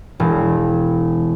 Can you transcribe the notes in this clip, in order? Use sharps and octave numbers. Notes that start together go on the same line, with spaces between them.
E1